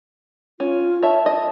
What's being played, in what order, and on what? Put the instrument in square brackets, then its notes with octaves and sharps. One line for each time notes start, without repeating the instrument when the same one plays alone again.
[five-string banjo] C#4 [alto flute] F4
[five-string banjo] C#5 E5 [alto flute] A5
[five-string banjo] D#5